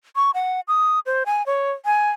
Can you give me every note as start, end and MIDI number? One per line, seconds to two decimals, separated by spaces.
0.16 0.31 85
0.34 0.61 78
0.68 0.99 87
1.06 1.23 72
1.26 1.45 80
1.46 1.71 73
1.85 2.11 80